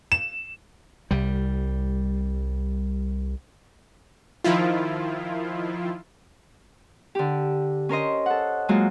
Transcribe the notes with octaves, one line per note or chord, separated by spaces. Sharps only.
E7
C2 G3
D#3 F3 E4 F4
D3 G4
C#4 A#4 C5 D#5
A4 F#5
F#3 G#3 A#3 F4 F#4